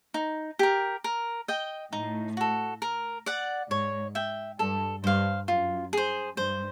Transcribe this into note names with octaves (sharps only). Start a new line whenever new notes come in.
D#4
G4 A#4
A#4
D#5 G5
A2 D#4
F#4 A4
A#4
D5 F#5
G#2 C#5
E5 G5
G2 A4
G2 C5 F5
F#2 F4
G#4 C5
G2 C5